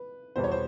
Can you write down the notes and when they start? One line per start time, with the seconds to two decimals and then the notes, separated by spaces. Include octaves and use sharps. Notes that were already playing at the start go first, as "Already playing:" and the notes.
Already playing: B4
0.36 E2 B2 G3 B3 C5
0.44 C#5
0.52 C5